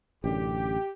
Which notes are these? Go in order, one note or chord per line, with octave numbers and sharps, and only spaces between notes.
A1 F#2 D3 G4